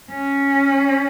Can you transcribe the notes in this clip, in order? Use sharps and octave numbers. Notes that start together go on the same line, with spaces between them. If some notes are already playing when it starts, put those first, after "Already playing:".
C#4